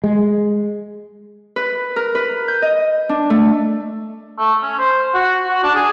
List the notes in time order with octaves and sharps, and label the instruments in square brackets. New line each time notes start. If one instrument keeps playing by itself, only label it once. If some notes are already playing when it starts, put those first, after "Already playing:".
[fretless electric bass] G#3
[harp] B4
A#4
B4
G6
D#5
D4
A3
[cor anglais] A3
C#4
C5
F#4
F#4
D4
G#4